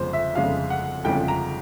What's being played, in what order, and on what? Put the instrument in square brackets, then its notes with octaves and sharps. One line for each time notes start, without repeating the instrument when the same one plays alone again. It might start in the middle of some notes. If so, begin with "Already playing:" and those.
Already playing: [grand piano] G1 F2 C#3 F3 G#3 C5
E5
G1 F2 C#3 F3 G#3 F5
F#5
G1 F2 C#3 F3 G#3 G5
A#5